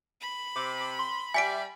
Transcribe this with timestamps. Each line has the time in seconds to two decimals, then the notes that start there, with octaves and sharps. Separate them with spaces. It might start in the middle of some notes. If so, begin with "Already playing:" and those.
0.21 B5
0.56 C3 D6
0.99 C6
1.34 G3 D5 E5 G#5 B6 D7